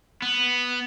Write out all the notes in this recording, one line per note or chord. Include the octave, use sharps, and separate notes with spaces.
B3